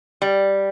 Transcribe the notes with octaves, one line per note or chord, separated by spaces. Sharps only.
G3